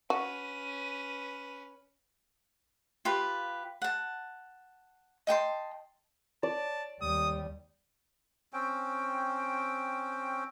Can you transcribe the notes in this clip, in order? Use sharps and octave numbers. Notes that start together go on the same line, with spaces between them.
C#4 F#4 B4 D#7
F4 G4 B4
F#5 A5
D#5 G5 A5 C6
D5 A5
D#2 G3 D#6
C4 C#4 G5